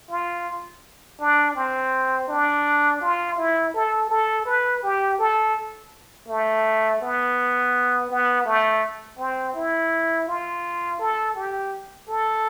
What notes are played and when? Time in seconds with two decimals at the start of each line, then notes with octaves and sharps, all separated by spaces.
0.10 F4
1.20 D4
1.55 C4
2.28 D4
3.02 F4
3.37 E4
3.74 A4
4.10 A4
4.46 B4
4.83 G4
5.19 A4
6.28 A3
7.01 B3
8.10 B3
8.46 A3
9.18 C4
9.55 E4
10.28 F4
11.00 A4
11.36 G4
12.09 A4